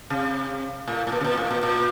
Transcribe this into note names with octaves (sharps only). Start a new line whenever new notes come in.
C3
A2
A2
A#2
C3
A#2
A2
A#2
A#2